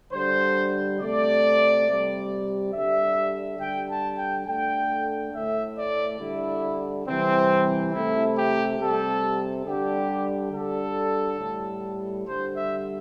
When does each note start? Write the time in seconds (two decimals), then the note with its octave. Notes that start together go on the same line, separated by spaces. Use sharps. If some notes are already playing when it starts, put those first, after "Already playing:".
0.13 D3 G3 C5
1.00 C3 A3 D5
1.87 C3 G3
2.73 D3 G3 E5
3.60 D3 G3 G5
3.88 A5
4.18 G5
4.46 D3 A3 G5
5.33 A2 A3 E5
5.76 D5
6.20 D3 G3 E4
7.06 C3 E3 G3 C4
7.93 C3 A3 E4
8.37 G4
8.80 C3 G3 A4
9.66 D3 G3 G4
10.53 D3 G3 A4
11.40 A2 G3
12.27 D3 G3 C5
12.55 E5